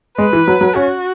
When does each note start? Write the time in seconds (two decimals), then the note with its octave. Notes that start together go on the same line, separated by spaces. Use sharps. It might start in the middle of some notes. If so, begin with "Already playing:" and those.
0.18 G#3 B4
0.33 E3
0.48 F#3
0.61 F#3
0.75 C#4 F#4